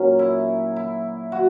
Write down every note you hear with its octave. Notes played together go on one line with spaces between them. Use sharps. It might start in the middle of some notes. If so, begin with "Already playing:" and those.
Already playing: A#2 F#3 A#3 C#4
E4
E4
F#4